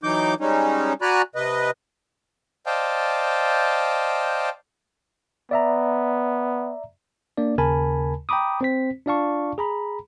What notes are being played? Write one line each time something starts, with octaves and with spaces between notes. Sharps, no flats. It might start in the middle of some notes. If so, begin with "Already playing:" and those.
E3 F#3 D#4 D6 G6
G3 G#3 C#4 D#4
F#4 D5 G#5 A#5 B5 F#6
C3 B4 D#5
C5 D5 D#5 F5 G5 A5
B3 D5 E5 A#5
A#3 D4 D5
D#2 C#3 A#4 G#5 A5 B5
G5 A#5 B5 D6 D#6
C4 C5 B6
D4 F4 D5 F5 A5 C#6
G#4 A#5 B5